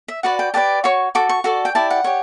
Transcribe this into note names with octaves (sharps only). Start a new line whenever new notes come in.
E5
F#4 B4 D5 F#5
G5
G4 B4 D5 A5
F#4 C#5 C#6
F#4 A4 D6
C#6
F#4 A4 D5
G5
E4 G4 D5 A5
F#5
G4 C#5